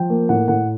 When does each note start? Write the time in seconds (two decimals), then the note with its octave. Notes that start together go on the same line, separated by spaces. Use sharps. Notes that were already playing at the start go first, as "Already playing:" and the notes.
Already playing: F3 G5
0.10 A#3
0.29 A2 F#5
0.48 A2 F#5